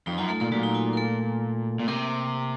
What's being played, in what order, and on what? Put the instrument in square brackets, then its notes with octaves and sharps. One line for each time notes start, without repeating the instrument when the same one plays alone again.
[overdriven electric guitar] F2 [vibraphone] D#4
[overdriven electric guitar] F#2 [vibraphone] F4
[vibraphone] A3 A4
[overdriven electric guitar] A#2 [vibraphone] A3 A4
[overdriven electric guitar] A#2 [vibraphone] F#3 F#4
[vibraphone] D#4
F4
A#4
A3 A4
[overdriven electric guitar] A#2
[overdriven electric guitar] C3 [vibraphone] A#3 A#4